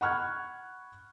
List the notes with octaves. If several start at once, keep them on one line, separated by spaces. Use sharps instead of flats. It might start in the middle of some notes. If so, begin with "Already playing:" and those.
F#5 B5 C#6 F6 F#6 G#6